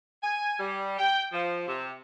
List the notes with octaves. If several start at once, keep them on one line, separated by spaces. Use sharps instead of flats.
G#5
G3
G5
F3
C3